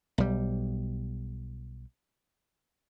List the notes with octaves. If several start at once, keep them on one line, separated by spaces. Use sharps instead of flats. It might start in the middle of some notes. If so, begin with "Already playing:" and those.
B1 G3